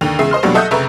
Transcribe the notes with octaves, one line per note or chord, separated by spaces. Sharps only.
D#2 D3 F7
E2 C#3 G#3 E5 C7
C5 D#5 C6 F6
E2 B2 F#3 G3 A#3 D4
A4 D#5 E5 F#5 D#6 G6
F1 C#3 B4 E5 A#5 C#6